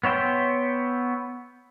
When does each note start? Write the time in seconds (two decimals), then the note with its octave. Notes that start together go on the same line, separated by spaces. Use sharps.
0.04 B3 C#5 E5 G5 C6